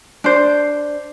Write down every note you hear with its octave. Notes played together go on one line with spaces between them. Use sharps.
D4 C5